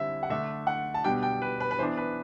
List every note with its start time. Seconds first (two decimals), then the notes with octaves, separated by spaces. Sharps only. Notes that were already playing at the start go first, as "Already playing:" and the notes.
Already playing: D3 G3 C4 E4 E5
0.23 F#5
0.30 D3 A3 D4 E5
0.67 F#5
0.94 A5
1.04 B2 G3 D4 G5
1.23 G5
1.42 B4
1.60 B4
1.71 B4
1.79 E3 B3 D4 C5
1.97 B4